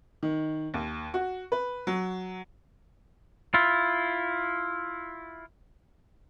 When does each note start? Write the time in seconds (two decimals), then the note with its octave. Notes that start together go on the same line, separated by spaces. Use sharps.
0.23 D#3
0.74 D#2
1.14 F#4
1.52 B4
1.87 F#3
3.54 E4 F4